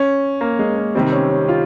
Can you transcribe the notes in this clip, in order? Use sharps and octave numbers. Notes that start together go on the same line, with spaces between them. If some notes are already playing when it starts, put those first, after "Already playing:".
Already playing: C#4
A#3
G#3
A#3
C3 D#3 G3 C4
C#4
C#4
F4